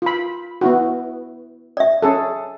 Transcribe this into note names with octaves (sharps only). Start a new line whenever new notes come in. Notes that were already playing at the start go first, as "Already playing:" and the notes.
F4 B5
B3 E4 F#4
D5 E5
C#4 G#4 A4